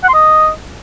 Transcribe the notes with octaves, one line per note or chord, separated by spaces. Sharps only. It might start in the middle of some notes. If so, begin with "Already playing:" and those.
F#5
C6
D#5